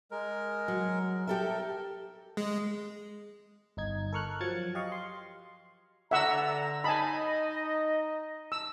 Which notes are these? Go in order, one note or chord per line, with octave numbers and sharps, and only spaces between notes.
G#3 A#4
F#3
G4 A4 A#4 E5
G#3
G1 D#4 G#6
A4 A#4 C#6 F6 F#6
F3 F#3 G#6 A6 C#7
G4 D#5 F5 C#6
C6
D3 E5 F#5 A#5 E6
D#4 D#5 G#5 A5 B5
E6